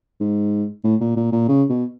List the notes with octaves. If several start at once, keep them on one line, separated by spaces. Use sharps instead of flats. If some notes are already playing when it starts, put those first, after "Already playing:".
G#2
A2
A#2
A#2
A#2
C#3
B2